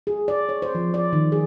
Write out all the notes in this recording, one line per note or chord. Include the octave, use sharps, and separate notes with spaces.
G#4
D5
C#5
C5
F3
D5
D#3
G#4